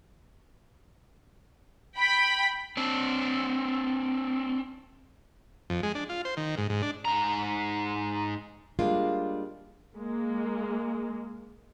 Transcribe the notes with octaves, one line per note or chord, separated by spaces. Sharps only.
G5 B5 B6
C4 D4
F2
G#3
D4
F4
C5
D#3
G#2
G#2
D4
G#2 A#5
G3 G#3 A#3 D4 F4
G#3 A#3